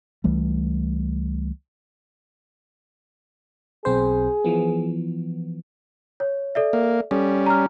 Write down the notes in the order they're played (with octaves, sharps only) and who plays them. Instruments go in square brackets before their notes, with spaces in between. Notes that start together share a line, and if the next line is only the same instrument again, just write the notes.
[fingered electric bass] C#2 E3 G3 A3
[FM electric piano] B1 C4 C5 [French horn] G#4
[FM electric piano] E3 F3 B3
[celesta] C#5
A4 D5 E5
[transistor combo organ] A#3
[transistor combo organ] G3 C#4 [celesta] A4
[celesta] A#5 F6